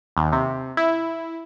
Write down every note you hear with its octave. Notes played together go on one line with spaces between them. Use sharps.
D#2
C3
E4